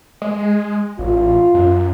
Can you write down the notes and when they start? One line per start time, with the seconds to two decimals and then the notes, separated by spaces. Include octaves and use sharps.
0.22 G#3
0.99 A1 F4
1.54 F#2